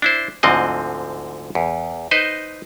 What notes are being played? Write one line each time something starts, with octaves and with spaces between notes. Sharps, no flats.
D4 E4 C5
D2 G#2 D3 F3 C4 D#5
E2
D#4 B4 C5 D#5